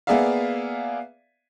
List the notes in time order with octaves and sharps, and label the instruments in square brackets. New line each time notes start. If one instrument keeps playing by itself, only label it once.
[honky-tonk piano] A#3 B3 G#4 D5 E5 F5